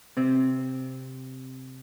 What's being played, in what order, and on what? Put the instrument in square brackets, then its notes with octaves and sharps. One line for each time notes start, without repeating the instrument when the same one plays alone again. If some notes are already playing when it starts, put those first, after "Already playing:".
[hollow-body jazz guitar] C3 C4